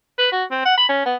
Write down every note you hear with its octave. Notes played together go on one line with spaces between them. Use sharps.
B4
F#4
C4
F#5
B5
C#4
B3